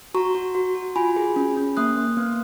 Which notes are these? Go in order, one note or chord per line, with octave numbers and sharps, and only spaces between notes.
F#4 A#5 C#6
F#4
F#4
F#4
F4 G#5 B5
G#4
C#4
C#4
A#3 D#6 F#6
A#3
B3